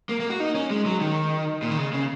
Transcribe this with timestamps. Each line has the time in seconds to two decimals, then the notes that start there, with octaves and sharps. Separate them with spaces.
0.09 A#3
0.20 A#3
0.30 F#4
0.40 D#4
0.55 C#4
0.70 G#3
0.85 F#3
1.01 D#3
1.62 A#2
1.71 D#3
1.77 C#3
1.93 C#3